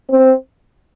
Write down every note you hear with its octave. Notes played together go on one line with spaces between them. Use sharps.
C4